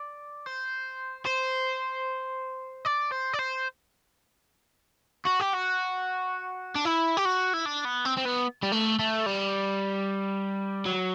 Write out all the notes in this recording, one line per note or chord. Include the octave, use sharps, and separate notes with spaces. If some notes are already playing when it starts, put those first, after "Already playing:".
Already playing: D5
C5
C5
D5
C5
D5
C5
F#4
G4
F#4
D4
E4
G4
F#4
E4
D4
B3
C4
C4
B3
G3
A3
A3
G3
F#3